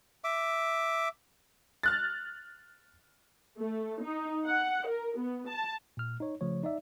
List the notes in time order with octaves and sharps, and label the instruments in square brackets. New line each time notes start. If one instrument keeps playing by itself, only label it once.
[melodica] E5 D6
[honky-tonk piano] F6 F#6 A6
[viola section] A3
D#4
F#5
A#4
B3
A5
[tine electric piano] A#2 F6
D#4 C#5
C#3 F3 A3 C#5
D#4 D5 E5